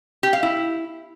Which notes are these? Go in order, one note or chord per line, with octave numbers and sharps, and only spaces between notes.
G4
F5
E4